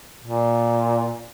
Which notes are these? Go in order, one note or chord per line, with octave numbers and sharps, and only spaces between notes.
A#2